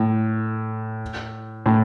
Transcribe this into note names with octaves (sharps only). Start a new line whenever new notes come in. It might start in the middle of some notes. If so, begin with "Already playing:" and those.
Already playing: A2
A2